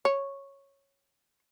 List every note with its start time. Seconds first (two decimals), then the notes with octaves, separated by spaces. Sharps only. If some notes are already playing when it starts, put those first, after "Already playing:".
0.05 C#5